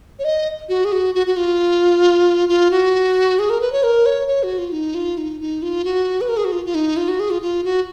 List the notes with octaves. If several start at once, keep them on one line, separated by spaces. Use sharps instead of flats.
C#5
D#5
F#4
G#4
F#4
F#4
F#4
F4
F4
F#4
G#4
A#4
B4
C#5
A#4
C#5
C#5
F#4
F4
D#4
F4
D#4
D#4
F4
F#4
B4
A#4
G#4
F#4
F4
F4
D#4
F4
F#4
G#4
F4
F4
F#4